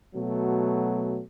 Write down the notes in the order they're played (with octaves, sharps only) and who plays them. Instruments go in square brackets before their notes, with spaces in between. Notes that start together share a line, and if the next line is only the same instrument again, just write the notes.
[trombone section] B2 F#3 A3